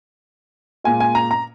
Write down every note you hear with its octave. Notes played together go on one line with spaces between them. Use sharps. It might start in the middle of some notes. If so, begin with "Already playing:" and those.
A#2 G#3 F4 G#5
G#5
A#5
A#5